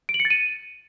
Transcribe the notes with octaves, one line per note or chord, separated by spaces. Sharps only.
D7
F#7
C#7
A6
D#7